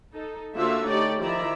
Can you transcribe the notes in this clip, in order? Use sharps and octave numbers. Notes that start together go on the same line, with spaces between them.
D#4 A4
D3 A#3 F4 F#4 C5 E5
A3 D#4 G4 C#5 D5
D#3 F3 E4 D5 E5 A#5